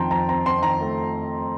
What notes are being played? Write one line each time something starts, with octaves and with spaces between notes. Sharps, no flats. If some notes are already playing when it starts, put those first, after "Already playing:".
Already playing: F2 D#3 C4 G5 A5 A#5 C6
F2 A#5
C4 A#5
C4 C6
D#3 A#5
A3